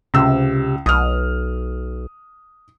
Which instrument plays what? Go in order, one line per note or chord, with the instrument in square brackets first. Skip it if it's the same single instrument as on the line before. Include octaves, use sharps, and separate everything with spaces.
[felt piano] C#2 E6 [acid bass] C3
[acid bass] B1 [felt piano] D#6 F6